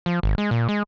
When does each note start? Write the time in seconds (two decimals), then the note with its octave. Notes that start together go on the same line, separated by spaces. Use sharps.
0.06 F3
0.23 G#1
0.38 G#3
0.51 A#2
0.69 G#3